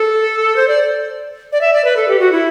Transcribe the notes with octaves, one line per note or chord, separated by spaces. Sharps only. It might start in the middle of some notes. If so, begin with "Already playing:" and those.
Already playing: A4
C5
D5
D5
E5
D5
B4
A4
G4
F#4
E4